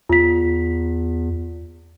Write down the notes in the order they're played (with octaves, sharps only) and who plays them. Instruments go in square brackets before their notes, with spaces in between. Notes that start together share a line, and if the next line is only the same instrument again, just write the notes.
[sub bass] E2 [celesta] F4 B6